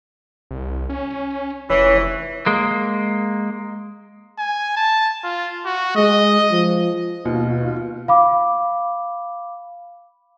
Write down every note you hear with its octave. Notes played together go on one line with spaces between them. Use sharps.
C2
C#4
F1 E3 C#5
G#3 A#3
G#5
A5
F4
F#4
G#3 D#5
F3
D#2 B2 D#4 F4
F5 B5 D6